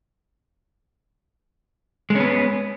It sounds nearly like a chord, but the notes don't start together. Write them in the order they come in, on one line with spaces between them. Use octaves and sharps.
G#3 C#4 B3